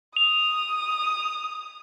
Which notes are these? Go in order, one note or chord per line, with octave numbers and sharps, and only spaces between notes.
D#6 F7